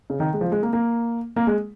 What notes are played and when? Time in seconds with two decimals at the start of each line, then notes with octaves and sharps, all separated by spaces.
0.10 C#3
0.20 D#3
0.33 G#3
0.41 F3
0.52 G#3
0.63 A#3
0.73 A#3
1.36 A#3
1.47 G#3